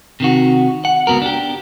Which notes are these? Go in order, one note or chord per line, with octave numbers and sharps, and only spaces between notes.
C3 D#3 F#4
F#5
C#2 G2 B3 F#4 A#4
D4 G4